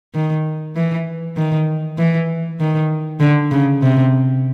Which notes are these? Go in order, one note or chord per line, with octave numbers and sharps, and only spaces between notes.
D#3
E3
D#3
E3
D#3
D3
C#3
C3